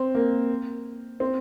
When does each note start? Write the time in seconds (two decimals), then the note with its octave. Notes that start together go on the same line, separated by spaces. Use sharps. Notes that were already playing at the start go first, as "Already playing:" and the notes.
Already playing: C4
0.15 A#3
1.20 C4